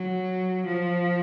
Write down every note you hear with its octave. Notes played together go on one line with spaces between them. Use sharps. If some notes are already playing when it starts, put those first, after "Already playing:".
Already playing: F#3
F3